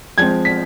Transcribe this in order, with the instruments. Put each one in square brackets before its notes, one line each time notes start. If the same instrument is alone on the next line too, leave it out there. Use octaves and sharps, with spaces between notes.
[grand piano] F3 G#3 C4 G#6
B6